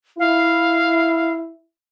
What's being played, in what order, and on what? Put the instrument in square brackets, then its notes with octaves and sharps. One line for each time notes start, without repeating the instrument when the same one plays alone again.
[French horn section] E4 [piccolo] F5